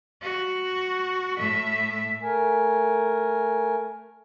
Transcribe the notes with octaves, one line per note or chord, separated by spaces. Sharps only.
F#4
A2 E5
A3 A#4 G#5